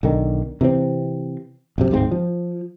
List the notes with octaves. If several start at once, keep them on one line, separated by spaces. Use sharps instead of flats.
B1 D3 D#3
C3 E3 F#3 C4
A#1 F#2 C3
D1 G#2 A3 C4
F3